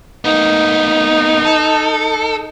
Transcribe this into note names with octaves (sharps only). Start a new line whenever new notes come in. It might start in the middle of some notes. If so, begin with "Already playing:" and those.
A#3 B3 D#4
A4